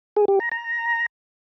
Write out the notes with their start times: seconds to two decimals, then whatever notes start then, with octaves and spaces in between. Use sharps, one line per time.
0.16 G#4
0.28 G4
0.40 A#5
0.52 A#5